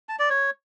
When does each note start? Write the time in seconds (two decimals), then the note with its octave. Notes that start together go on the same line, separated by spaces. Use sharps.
0.09 A5
0.19 D5
0.30 C#5